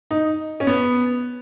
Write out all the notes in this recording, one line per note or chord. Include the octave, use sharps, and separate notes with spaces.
D#4
C#4
B3